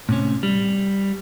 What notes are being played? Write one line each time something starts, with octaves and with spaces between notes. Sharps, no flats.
A2 C3 C#4
G3